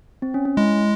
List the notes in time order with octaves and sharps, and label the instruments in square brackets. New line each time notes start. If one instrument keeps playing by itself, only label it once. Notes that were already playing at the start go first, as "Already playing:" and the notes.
[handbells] C4
C#4
C#4
[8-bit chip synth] G#3 [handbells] E4